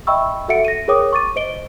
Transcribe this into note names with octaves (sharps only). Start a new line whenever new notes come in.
D#5 E5 G5 B5 C#6 E6
F#4 A4 E5 F#5 C#7 D7
A#6 D#7
G#4 A#4 C#5 G5 D6 D#6
C#6 D6 A6 D#7
C5 D#5 D7 G7